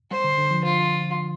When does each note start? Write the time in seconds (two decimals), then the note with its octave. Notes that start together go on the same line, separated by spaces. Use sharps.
0.11 G3 C5
0.24 D3
0.38 D3
0.51 F3
0.65 F4